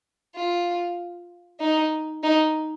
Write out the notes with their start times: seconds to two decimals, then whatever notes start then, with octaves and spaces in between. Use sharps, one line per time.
0.36 F4
1.60 D#4
2.23 D#4